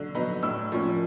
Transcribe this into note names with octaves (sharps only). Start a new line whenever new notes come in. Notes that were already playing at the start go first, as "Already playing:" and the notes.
Already playing: D3 F#3
F#3 B3 D#4
A2 E6
F3 A#3 C#4